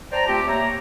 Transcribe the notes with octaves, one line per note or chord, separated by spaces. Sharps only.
C5 D5 G5 A5 A#5
A3 C4 F4 G4
A#3 C#5 E5 A#5